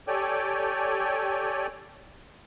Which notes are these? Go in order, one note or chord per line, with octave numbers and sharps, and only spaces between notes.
G4 A4 C#5 D5 G5 G#5